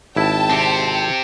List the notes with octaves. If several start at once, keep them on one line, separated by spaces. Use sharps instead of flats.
G#1 E4 G5 A5
C4 G4